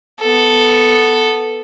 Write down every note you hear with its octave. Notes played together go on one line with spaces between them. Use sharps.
B3 A4